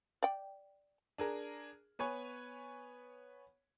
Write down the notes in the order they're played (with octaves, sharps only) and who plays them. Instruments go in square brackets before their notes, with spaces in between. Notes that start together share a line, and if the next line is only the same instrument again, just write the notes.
[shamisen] D5 G5
[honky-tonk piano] D4 G#4 A#4
B3 B4 C#5 G#5